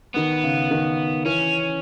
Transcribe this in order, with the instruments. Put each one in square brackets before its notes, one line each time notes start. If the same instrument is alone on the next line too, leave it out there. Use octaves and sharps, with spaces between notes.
[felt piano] D#3 [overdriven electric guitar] B3
[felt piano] C#3
D#3
[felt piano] E3 [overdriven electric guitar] C#4